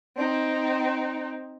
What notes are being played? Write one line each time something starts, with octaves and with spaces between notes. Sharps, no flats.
C4 D#4